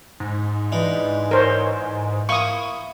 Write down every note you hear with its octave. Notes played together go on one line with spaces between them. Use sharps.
G#2
E3 D4 D#4
A#4 C5 C#5
A#3 E4 C#6 D#6